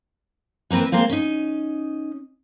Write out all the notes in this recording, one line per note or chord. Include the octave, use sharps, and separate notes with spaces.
E3 A#3 C4 A#4 B4
G#3 A#3 C4 C5 F5
C#4 D#4